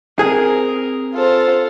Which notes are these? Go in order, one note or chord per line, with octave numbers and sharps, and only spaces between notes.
C4 G#4 A#4
F4 A4 C5